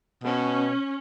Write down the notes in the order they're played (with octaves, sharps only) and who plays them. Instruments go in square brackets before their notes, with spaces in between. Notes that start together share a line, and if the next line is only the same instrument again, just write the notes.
[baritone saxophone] B2 [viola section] C#4